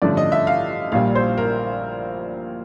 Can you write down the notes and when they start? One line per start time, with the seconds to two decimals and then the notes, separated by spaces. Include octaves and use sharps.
0.02 A1 G2 D3 F3 A3 D5
0.17 D#5
0.32 E5
0.47 F5
0.92 A#1 A#2 G3 F5
1.15 C5
1.38 A#4